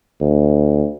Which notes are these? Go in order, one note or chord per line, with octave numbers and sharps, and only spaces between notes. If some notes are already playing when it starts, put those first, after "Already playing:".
D2